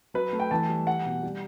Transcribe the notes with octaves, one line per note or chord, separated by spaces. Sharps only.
F#3 B4
A3
G5
E3 A5
G3
G3 F#5
B2
G3